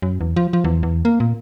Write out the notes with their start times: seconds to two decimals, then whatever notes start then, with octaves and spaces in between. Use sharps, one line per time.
0.02 F#2
0.21 E2
0.36 F3
0.53 F3
0.64 E2
0.83 E2
1.05 A#3
1.20 A#2